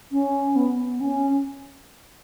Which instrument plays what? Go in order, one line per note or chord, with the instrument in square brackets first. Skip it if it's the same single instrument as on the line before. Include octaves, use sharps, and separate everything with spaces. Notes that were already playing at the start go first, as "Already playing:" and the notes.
[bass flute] C#4
B3
C#4